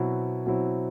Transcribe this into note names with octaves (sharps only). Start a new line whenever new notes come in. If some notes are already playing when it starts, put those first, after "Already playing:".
Already playing: B2 F#3 C4 E4
B2 F#3 C4 E4